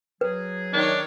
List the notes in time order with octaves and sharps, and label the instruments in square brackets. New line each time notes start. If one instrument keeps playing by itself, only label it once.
[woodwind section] F#3 G#4 [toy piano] B4
[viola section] D#3 C#5 [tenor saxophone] D4